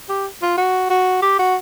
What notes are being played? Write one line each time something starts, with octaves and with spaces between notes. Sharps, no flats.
G4
F4
F#4
F#4
G4
F#4